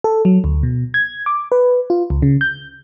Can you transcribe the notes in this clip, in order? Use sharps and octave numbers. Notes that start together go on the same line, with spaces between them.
A4
F#3
D2
B2
G#6
D6
B4
F4
C#2
C#3
G6